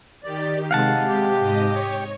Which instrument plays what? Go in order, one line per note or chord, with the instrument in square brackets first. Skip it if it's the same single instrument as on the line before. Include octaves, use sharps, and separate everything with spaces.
[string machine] D#3 G4 [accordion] D5
[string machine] C3 G#3 [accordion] D#3 [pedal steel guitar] F5 F#5 A5
[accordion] G4
[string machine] G#2 D#5
C#5